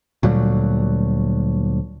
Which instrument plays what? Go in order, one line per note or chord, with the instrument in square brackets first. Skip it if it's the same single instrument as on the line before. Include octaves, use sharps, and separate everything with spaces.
[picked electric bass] D2 A#2 F#3 G3